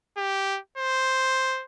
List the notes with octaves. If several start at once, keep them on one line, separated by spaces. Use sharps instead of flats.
G4
C5